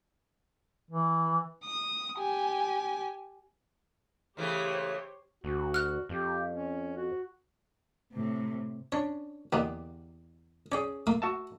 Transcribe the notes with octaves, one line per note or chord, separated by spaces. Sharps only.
E3
D#6
G4 G#5
C#3 E3 A3 G4 C5 C#5
D2 F#4
F6 F#6
F2 G4
C#4
F#4
A2 C3
C#4 D4 C#5
E2 B2 D3 A#3 B3 G4
C#4 G#4 D5 G5
A3 A#3 A4
F#4 E5 A5